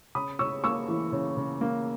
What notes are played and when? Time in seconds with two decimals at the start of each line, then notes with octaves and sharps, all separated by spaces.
0.15 C#3 B5 D#6
0.39 C#3 C#6 E6
0.64 A#3 C#6 E6
0.88 E3
1.12 C#3
1.37 C#3
1.61 A#3